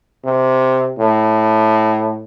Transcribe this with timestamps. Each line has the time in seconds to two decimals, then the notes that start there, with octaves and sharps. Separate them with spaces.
0.24 C3
0.98 A2